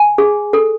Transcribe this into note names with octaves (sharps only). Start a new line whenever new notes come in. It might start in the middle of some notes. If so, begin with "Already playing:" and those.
Already playing: G#5
G#4
A4